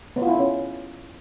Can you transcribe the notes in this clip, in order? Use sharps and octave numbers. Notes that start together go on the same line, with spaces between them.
B3
F4
E4
D4
C#4